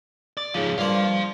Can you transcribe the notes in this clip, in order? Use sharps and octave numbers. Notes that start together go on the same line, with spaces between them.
D5
G#2 C#3 F3
G2 A#3 F4 C5